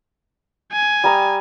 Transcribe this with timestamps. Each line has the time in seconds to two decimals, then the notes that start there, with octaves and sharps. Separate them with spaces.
0.72 G#5
1.04 G3 A#5 D#6